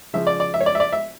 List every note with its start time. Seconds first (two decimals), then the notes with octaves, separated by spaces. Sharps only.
0.14 C#3 F3 E5
0.27 D5
0.40 D5
0.54 E5
0.61 C#5
0.66 D5
0.75 E5
0.80 D5
0.93 E5